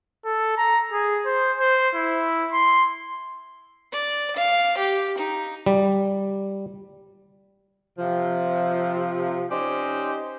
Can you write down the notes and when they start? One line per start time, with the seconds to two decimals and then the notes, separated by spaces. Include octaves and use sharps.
0.25 A4
0.57 A#5
0.92 G#4
1.25 C5
1.58 C5
1.95 E4
2.52 C6
3.92 D5
4.36 F5
4.78 G4
5.18 D#4
5.66 G3
7.99 C3 F3
9.51 C#4 D#4 G4 C5 D5